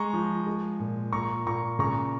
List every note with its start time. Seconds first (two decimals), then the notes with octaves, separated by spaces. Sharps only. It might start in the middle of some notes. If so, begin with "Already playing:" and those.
Already playing: G#3 A#5 C#6
0.13 F3
0.47 G#3
0.80 A#2
1.13 A#2 A#5 C#6
1.46 A#2 A#5 C#6
1.79 C#3 A#5 C#6